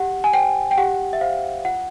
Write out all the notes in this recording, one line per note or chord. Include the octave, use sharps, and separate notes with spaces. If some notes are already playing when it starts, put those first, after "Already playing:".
Already playing: G4 F#5
G#5
C5 G5
G5
G4 F#5
E5
C5 F5
F4 F#5